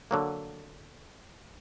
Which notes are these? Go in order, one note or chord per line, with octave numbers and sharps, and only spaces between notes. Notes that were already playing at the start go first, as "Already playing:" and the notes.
D3 F#3 A#3